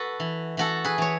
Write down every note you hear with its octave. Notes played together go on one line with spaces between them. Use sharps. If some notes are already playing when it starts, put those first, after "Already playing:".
Already playing: F#4 A4 B4
E3
E3 F#4 A4
G#4 B4
E3 C#5